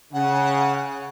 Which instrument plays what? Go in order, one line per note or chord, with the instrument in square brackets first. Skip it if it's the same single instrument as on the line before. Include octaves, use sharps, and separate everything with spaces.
[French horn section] C#3 [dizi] F#5